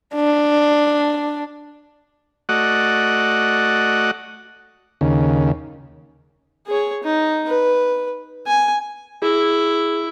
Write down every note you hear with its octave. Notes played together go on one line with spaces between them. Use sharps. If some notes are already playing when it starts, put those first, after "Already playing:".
D4
A3 F#4 D5 D#5 F#5
D#2 C#3
G#4 C#5
D#4
B4
G#5
E4 G#4